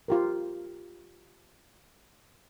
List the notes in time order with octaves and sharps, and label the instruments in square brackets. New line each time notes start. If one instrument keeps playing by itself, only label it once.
[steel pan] F4 G4 A#4